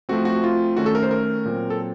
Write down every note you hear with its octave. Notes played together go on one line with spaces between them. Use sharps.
F3 A3 C4 F#4
F#4
F4
D#3 A3 C#4 F#4
A4
A#4
C5
A#4
A#2 F#3 C4
A4